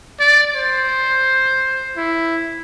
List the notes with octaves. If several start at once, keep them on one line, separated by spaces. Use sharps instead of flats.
D5
C5
E4